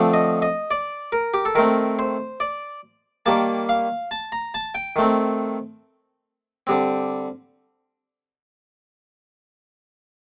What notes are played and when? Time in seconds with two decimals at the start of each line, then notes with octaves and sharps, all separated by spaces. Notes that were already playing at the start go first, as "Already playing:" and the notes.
Already playing: D3 F3 A3 C4
0.14 D#5
0.42 D#5
0.71 D5
1.12 A#4
1.34 G4
1.45 A4
1.55 D#3 A3 C4 A#4
1.99 C5
2.40 D5
3.26 D#3 G3 A#3 A5
3.69 F5
4.11 A5
4.32 A#5
4.54 A5
4.75 G5
4.96 D#3 A3 C4
6.67 D3 G3 C4